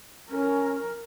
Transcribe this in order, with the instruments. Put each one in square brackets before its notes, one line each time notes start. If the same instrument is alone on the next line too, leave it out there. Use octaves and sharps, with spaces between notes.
[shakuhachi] C#4 [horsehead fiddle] A#4